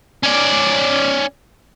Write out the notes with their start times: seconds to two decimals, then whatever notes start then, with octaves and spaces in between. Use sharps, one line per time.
0.23 C#4 D5